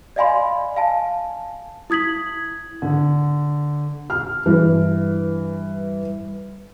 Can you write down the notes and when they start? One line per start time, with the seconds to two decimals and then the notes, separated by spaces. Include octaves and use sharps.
0.16 D5 D#5 F5 G#5 B5 C6
0.76 F5 G#5 A5
1.90 E4 D#6 G#6 B6 F#7
2.82 D3
4.10 F6
4.46 G2 E3